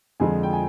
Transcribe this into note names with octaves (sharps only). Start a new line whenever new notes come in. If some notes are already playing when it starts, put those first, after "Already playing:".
F2 D3 F3 G#3 G#5
G5
G#5